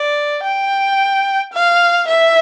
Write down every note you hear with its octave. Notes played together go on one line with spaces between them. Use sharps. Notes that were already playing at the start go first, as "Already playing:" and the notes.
Already playing: D5
G5
F5
E5